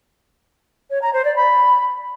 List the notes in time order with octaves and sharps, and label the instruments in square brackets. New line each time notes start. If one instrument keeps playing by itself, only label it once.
[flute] C#5
A#5
C5
D5
B5